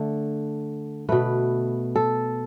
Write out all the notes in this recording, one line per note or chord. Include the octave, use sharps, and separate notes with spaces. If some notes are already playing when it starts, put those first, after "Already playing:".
Already playing: D3 A3
B2 A3 B4
A4